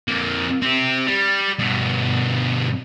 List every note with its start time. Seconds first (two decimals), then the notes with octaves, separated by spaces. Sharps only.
0.08 F2 A#3
0.62 C4 G4
1.07 G3
1.59 G2 B2